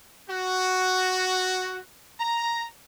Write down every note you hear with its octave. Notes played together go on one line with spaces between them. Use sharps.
F#4
A#5